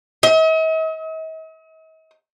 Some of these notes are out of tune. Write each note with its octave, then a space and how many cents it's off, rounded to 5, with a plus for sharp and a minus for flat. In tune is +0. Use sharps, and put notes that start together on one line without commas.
D#5 +45